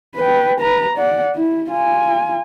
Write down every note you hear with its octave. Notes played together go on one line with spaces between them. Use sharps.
B4 G5
B4 A#5
D5 F#5
E4
F4 G#5